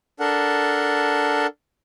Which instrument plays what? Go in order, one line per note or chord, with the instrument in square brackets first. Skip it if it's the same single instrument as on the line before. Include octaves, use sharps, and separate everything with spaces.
[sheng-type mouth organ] D4 A4 A#4 F#5